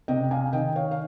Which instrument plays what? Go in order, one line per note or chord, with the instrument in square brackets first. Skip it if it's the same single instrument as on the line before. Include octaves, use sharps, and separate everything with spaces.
[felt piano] C3 D#5 G5
F5 G#5
D#3 D#5 G5
C#5 F5
F5